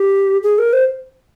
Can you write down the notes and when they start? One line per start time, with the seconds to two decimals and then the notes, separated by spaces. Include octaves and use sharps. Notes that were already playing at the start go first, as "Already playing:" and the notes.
Already playing: G4
0.43 G#4
0.58 A#4
0.73 C5